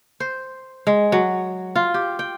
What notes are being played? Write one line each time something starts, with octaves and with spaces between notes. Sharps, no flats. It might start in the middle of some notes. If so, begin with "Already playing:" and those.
C5
G#3
F#3
F4
G4
G5